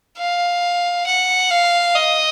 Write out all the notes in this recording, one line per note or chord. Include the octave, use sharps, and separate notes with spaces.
F5
F#5
F5
D#5